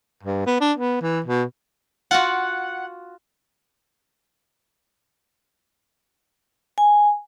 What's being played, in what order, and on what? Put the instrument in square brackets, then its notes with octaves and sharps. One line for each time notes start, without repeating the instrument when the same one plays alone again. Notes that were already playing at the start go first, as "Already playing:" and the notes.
[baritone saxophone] G2
B3
D4
B3
E3
B2
[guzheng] F4 F#4 [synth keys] F#5
[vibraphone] G#5